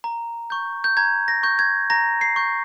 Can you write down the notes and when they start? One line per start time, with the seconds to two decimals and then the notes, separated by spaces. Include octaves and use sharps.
0.04 A#5
0.50 C#6 G6
0.84 G6
0.97 A#5 G#6
1.28 A#6
1.43 C#6 G6
1.59 G#6
1.90 A#5 A#6
2.21 C7
2.36 C#6 G6